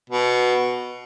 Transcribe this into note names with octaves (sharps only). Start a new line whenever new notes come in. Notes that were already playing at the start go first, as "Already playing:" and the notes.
B2